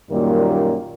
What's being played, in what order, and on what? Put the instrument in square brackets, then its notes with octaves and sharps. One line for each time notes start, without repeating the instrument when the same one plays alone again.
[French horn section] F#2 A#2 D#3 G3 A#3